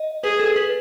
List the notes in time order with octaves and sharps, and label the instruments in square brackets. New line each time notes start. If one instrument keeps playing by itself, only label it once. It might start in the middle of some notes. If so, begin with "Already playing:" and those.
Already playing: [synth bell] D#5
[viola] G#4 [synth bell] B4
[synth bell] A4
B4